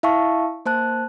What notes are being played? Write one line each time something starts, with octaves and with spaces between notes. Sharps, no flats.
E4 E5 F5 A5 C#6
A#3 C5 A5 F#6